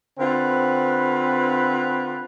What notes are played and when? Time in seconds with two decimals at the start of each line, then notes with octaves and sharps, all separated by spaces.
0.19 D3 C4 F4 B4